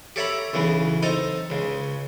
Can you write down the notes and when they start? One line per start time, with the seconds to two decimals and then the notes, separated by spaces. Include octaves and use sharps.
0.16 G4 A4 C#5 E5 A#5 B5
0.54 B1 C#3 E3 B3
1.03 C4 D#4 A4 D#5 A#5
1.50 C#2 C#3